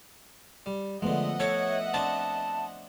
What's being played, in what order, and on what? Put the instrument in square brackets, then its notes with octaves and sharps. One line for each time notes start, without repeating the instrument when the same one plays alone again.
[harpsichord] G3
[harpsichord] D3 G#3 [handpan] F3 A3 B3 [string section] D#5 E5 F#5
[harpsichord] A4 [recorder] C#5
[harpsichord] C4 D4 [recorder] A5